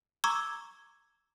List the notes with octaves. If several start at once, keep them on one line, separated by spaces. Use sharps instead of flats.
A#5 C#6 D6 E6 G#6